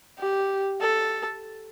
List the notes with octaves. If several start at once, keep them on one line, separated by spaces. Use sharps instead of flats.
G4
A4